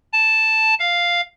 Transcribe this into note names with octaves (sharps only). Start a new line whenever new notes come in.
A5
F5